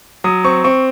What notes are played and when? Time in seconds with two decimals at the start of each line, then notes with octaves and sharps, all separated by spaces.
0.24 F#3 D#6
0.44 C4 C#6
0.64 C4 C#6